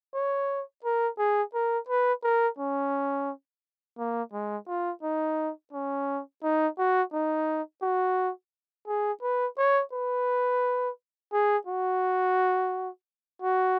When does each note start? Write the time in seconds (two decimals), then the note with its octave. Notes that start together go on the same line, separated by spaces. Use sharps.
0.14 C#5
0.85 A#4
1.18 G#4
1.54 A#4
1.89 B4
2.24 A#4
2.58 C#4
3.98 A#3
4.33 G#3
4.68 F4
5.03 D#4
5.73 C#4
6.43 D#4
6.78 F#4
7.13 D#4
7.82 F#4
8.88 G#4
9.23 B4
9.58 C#5
9.93 B4
11.33 G#4
11.67 F#4
13.42 F#4